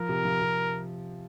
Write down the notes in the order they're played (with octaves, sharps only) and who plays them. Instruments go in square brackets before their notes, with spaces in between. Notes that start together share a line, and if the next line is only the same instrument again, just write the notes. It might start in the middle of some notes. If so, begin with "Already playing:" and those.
Already playing: [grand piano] F3 [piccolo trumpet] A#4
[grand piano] C3
F3
C3